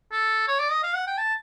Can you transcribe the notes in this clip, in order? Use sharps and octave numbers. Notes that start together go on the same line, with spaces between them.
A4
C#5
D5
D#5
F5
F#5
G5
A5